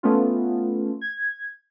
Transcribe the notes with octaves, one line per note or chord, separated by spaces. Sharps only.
A3 B3 C#4 F4
G#6